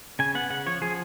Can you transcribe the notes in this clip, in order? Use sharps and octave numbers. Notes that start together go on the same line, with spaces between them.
C#3 G#5
B3 F#5
C#3 F#5
F3 C#5
F3 G#4